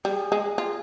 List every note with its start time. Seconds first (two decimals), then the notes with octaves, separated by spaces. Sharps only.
0.05 G3 G#4
0.32 G#3
0.58 F4